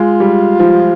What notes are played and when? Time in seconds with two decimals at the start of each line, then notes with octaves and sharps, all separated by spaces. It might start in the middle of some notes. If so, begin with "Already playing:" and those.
Already playing: G#3 F4
0.20 G3
0.59 F3